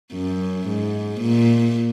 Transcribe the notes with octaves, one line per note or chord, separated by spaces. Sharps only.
F#2
G#2
A#2